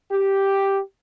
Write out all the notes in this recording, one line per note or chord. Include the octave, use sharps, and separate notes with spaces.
G4